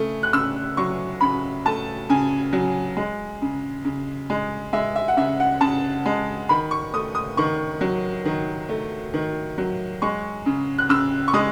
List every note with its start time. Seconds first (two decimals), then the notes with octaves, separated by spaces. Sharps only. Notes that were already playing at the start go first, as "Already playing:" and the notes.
Already playing: C#3 A3
0.23 F#6
0.33 C#3 E6
0.77 F#3 C#6
1.21 C#3 B5
1.66 A3 A5
2.10 C#3 G#5
2.53 F#3
2.97 G#3
3.42 C#3
3.85 C#3
4.30 G#3
4.73 G#3 E5
4.96 E5
5.08 F#5
5.17 C#3 E5
5.40 F#5
5.61 C#3 A5
6.06 G#3
6.49 D#3 B5
6.71 C#6
6.93 A3 D#6
7.15 D#6
7.37 D#3 C#6
7.81 F#3
8.25 D#3
8.69 A3
9.14 D#3
9.58 F#3
10.02 G#3 C#6
10.46 C#3
10.78 F#6
10.89 C#3 E6
11.28 C#6
11.34 G#3 D#6